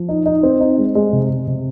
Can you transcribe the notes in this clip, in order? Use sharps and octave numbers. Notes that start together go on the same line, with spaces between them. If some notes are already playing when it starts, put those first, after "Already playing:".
Already playing: F3
D#4
D#4
C4
D#4
G#3
G#3
C3
C3
C3